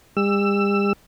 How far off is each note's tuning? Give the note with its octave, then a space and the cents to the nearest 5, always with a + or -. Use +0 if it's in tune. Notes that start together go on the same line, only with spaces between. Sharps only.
G3 +45 E6 +15